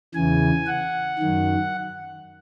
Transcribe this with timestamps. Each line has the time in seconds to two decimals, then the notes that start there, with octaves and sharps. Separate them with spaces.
0.15 E2 C#3 E3 G#5
0.67 F#5
1.19 F#2 D#3